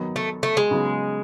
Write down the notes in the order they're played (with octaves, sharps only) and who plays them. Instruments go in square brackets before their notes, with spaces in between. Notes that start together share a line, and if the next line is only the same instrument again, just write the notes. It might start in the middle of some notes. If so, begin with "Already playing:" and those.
Already playing: [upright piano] D#3 F#3 B3 D#4
[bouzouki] A3
A3
G#3
[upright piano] C#3 F#3 B3 D#4